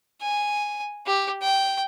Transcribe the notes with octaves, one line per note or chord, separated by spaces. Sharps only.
G#5
G4
G5